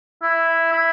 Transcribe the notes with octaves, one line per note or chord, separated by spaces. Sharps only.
E4
E4